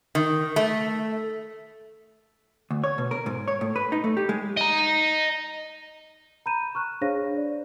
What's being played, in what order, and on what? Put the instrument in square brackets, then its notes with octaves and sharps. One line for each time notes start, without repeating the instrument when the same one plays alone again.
[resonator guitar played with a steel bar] D#3
A3
[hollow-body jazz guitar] D2
C#5
B2
A#4
G#2
C#5
A2
B4
D#4
A3
G4
G#3
[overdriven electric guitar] D#5 A#5
[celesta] A#5 B5 G6 D#7 E7
C#6 F6 F#6
D4 G#4 C5 C#5 F5 A#6
D5